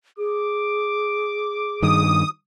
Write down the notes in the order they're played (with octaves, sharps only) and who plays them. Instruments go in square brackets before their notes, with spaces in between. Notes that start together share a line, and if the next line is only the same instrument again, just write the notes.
[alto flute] G#4 [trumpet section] D6
[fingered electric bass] G2 D#3 [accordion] D#6